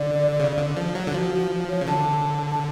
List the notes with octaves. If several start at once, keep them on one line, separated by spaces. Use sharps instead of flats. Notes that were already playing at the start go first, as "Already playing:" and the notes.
Already playing: D3 D5
C#3
D3
F3
F#3
D3
F3 F#4
F#4
C#5
C#3
D3 A5
A5